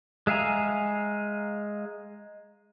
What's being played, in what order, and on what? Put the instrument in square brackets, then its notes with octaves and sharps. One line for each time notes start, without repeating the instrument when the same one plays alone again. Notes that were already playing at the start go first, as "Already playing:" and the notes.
[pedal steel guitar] G#3 E5 F5 G#5 A#5